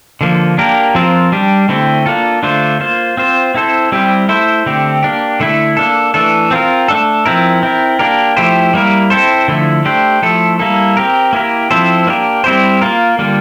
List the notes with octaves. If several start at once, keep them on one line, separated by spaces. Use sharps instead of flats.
D3 F3 A#3
A#3 D4 G4 A#4
F3 C4 F4 A#4
G3 D4 G4
D3 A3 C4 E4
A#3 D4 F4 A4
D3 A3 D4 F4 C5
A#3 F4 C5
C4 F4 C5
C4 E4 A4 C5
G3 C4 E4 G4
A3 E4 A4 C5
D3 A3 C4 G4
A#3 D4 G4
D3 A3 E4
A#3 D4 A4
E3 A3 D4 A4
C4 F4 A#4
A3 D4 A4
F3 C4 E4 A#4
C4 E4 A#4
A#3 D4 G4 A#4
F3 A3 E4 G4 C5
G3 A#3 E4 A#4
C4 E4 A4 C5
D3 F3 A3 E4
A3 D4 G4 C5
F3 A3 E4 A4
G3 A#3 E4 A4
C4 G4 A#4
A#3 E4 G4 A#4
F3 C4 E4 A4 C5
A#3 D4 G4 A#4
G3 C4 E4 G4 C5
A#3 F4 A#4
D3 G3 A#3 F4